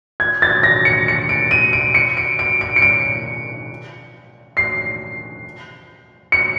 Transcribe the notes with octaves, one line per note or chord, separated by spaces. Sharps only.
G#6
A6
A#6
C#7
C#7
D7
D#7
D7
C#7
D7
D7
D7
C#7
D7
C7
C#7